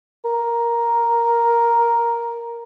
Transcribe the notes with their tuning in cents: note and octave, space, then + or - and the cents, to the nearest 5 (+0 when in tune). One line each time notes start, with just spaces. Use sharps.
A#4 +5